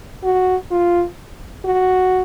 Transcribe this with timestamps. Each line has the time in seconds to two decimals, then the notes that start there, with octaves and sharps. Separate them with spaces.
0.23 F#4
0.71 F4
1.65 F#4